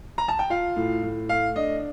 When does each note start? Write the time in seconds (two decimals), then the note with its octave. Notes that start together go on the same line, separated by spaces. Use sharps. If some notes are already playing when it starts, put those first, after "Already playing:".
0.18 A#5
0.28 A5
0.39 G5
0.50 F4 F5
0.76 A2
1.03 A2
1.29 A3 F5
1.56 D4 D#5